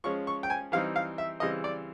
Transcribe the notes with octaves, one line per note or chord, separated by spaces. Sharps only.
F3 G#3 C#4 C#6
C#6
G5
G#5
E3 G3 C4 D#4 F5
F5
E5
C#3 E3 G3 C4 D#5
D5